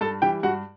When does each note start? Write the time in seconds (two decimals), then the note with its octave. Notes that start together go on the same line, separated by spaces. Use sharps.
0.01 G2 A4 A5
0.22 E3 G3 G4 G5
0.43 G2 F#4 F#5